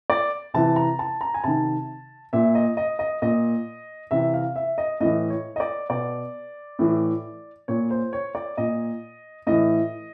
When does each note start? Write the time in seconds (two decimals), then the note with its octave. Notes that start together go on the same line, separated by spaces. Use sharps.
0.10 D5
0.54 C3 E3 A5
0.76 A#5
0.99 A5
1.21 A#5
1.34 G#5
1.44 C3 D#3 A5
2.33 A#2 E5
2.55 D#5
2.77 D#5
2.99 D#5
3.22 A#2 D#5
4.11 C3 E3 E5
4.34 F5
4.56 E5
4.78 D#5
5.00 A2 E3 D#5
5.30 C#5
5.56 D#5
5.60 D5
5.90 B2 D5
6.79 A2 E3
7.68 A#2 C#5
7.91 C5
8.13 C#5
8.35 D5
8.57 A#2 D#5
9.47 A2 E3 D#5